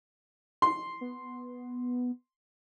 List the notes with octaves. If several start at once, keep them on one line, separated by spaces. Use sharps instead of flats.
C6
B3